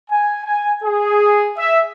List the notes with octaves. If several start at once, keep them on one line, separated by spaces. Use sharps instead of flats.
G#5
G#5
G#4
E5